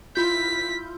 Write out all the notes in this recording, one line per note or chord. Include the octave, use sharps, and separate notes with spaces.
E4 F4 G6 B6